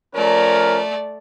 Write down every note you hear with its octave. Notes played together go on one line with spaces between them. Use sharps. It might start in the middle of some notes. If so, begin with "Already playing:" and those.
F3 A3 C#4 A#4 D5